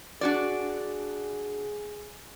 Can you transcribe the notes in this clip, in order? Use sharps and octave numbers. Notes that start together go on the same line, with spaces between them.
D4 F#4 G#4 D5